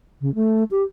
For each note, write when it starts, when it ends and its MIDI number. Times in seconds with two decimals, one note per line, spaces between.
0.21 0.33 49
0.35 0.64 57
0.71 0.83 67